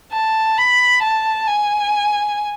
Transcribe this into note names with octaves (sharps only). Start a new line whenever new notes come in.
A5
B5
A5
G#5